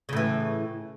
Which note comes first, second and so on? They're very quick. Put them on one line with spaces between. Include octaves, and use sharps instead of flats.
C#3 A2 E3